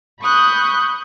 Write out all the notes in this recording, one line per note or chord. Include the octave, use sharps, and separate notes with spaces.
B5 C#6 D#6 F#6 G6